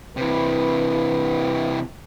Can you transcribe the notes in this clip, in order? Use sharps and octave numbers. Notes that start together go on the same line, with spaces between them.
C3 E3 B4